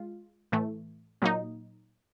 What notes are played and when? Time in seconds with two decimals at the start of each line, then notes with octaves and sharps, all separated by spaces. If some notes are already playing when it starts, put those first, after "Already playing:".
Already playing: G#3 F4
0.52 A2 E3 A3
1.22 A#2 F#3 A#3 D#4